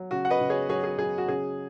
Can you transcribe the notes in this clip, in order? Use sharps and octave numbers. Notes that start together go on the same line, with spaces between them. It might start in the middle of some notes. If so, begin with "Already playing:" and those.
Already playing: F#3
C#3 F#4
F#5
B4 D#5
C#3
G#4 C#5
F#3 G#4 C#5
G#4
F#3 G#4
F#4
C#3 G#4